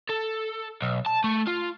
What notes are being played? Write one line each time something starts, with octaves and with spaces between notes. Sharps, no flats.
A4
B1
A5
A3
F4